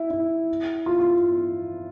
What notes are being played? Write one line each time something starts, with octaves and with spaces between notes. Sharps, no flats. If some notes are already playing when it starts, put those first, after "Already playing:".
Already playing: E4
E4
F4
F4